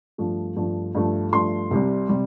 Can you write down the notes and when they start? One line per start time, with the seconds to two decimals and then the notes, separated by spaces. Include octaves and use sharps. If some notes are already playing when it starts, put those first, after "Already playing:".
0.18 G2 F3 A3
0.56 G2 F3 A3
0.95 G2 F3 A3
1.32 G2 F3 A3 C6
1.71 C2 C3 G3
2.09 C3 G3